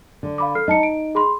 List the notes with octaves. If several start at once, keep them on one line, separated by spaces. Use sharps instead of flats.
D3
F5 B5 D6
A4 F6 C7
D#4 D#5 A5 C#7
D7
G#4 B5 C6